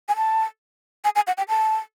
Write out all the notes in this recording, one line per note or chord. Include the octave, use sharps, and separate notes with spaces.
G#5
A5
G#5
G#5
F#5
G5
A5